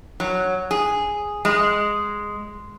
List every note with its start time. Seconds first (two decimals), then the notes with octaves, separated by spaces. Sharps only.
0.20 F#3
0.71 G#4
1.45 G#3